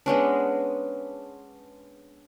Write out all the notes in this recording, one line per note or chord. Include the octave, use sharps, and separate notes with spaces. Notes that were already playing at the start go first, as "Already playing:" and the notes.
G#3 B3 C#4 D4